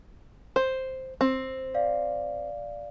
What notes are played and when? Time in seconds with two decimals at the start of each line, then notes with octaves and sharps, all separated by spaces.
0.56 C5
1.21 C4
1.74 D5 F5